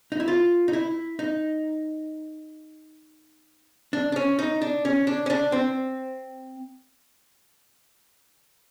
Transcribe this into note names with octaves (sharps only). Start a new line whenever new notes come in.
D#4
E4
F4
D#4
E4
D#4
D4
D4
C#4
D#4
D4
C#4
D4
C#4
D4
C4